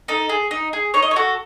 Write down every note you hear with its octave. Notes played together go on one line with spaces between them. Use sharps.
D#4 A4
G#4
D#4
G#4
D#4 C#5
D#5
C#5
F#4 A4